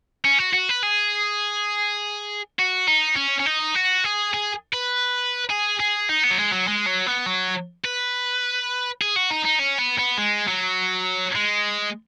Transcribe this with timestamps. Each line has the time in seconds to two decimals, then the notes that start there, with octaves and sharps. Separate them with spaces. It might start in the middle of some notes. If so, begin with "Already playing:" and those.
0.25 C#4
0.39 F#4
0.53 F#4
0.69 B4
0.83 G#4
2.59 F#4
2.88 D#4
3.16 C#4
3.40 C#4
3.46 D#4
3.75 F#4
4.05 G#4
4.34 G#4
4.73 B4
5.50 G#4
5.80 G#4
6.09 D#4
6.24 B3
6.31 F#3
6.38 G#3
6.53 F#3
6.68 G#3
6.86 F#3
7.07 B3
7.26 F#3
7.85 B4
9.01 G#4
9.16 F#4
9.30 D#4
9.45 D#4
9.60 C#4
9.79 B3
9.99 B3
10.18 G#3
10.48 F#3
11.35 G#3